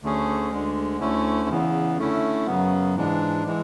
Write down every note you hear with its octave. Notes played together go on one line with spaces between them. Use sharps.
D2 D3 A3 C#4 G#4
D2 D3 G#3
D2 D3 A3 C#4 E4
E2 C#3 E3 B3
D3 A3 C#4 E4
F#2 C#3 F#3 B3
G#2 E3 G#3 D4
E3 G#3